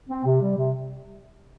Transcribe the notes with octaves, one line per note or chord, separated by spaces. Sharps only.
C4
C3
G3
C3